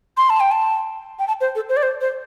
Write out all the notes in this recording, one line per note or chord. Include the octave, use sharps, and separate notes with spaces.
C6
A5
G5
A5
G5
A5
C5
A4
C5
D5
C5
C5